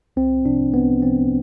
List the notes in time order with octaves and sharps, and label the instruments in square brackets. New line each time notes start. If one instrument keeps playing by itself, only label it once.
[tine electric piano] C2 C4
C3 F3 D4
C2 B3
C3 F3 C4